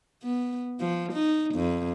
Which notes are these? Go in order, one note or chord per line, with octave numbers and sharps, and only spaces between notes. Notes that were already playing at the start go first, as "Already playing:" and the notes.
B3
F3
D#4
F2